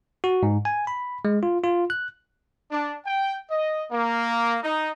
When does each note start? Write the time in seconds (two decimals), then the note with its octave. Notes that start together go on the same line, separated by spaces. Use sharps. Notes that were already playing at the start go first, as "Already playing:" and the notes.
0.24 F#4
0.43 G#2
0.65 G#5
0.87 B5
1.25 G#3
1.43 F4
1.64 F4
1.90 F#6
2.71 D4
3.06 G5
3.51 D#5
3.92 A#3
4.63 D#4